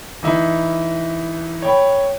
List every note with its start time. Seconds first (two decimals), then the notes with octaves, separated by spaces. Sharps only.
0.23 E3 D#4 E4
1.62 C#5 G5 B5